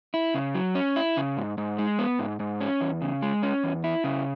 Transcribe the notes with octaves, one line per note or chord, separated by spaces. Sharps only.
E4
C#3
F#3
C#4
E4
C#3
G#2
G#2
G#3
B3
G#2
G#2
C#4
E2
C#3
G#3
C#4
E2
E4
C#3